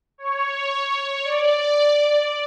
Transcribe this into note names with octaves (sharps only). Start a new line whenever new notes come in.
C#5
D5